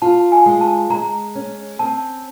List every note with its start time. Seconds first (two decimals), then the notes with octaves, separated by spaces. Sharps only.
0.02 F4 A5
0.32 G#5
0.46 G#3
0.61 A5
0.90 G#3 A#5
1.35 C#4
1.79 C4 A5